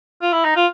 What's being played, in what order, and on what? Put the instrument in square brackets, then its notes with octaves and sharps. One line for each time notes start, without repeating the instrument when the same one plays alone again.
[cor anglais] F4
E4
D#4
F4